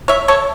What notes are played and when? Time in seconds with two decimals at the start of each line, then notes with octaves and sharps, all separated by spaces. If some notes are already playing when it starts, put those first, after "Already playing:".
0.08 C#5 E5
0.28 A4 C#5